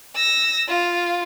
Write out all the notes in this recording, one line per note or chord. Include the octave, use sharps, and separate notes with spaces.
E6 A#6
F4